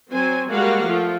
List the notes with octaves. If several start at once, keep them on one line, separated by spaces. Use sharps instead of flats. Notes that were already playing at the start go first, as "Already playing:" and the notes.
F#3 C4 C5 G#5
G3 G#3 A#3 F#4 F5 F#5
F3 A3 F4